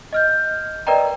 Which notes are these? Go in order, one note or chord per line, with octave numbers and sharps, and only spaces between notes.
D#5 F6 G6
A#4 B4 D5 D#5 G5 A#5